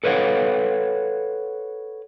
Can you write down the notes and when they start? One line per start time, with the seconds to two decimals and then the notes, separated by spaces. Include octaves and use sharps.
0.04 A4 B4 C#5 F5 F#5